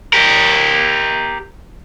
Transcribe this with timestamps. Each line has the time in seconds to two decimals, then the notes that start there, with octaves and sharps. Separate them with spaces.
0.13 G4 A#4